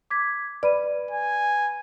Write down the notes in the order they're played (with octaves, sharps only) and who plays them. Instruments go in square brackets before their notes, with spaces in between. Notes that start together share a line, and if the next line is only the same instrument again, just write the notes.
[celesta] D6 G#6 B6
[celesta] B4 B5 D#7 [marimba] D5
[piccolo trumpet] G#5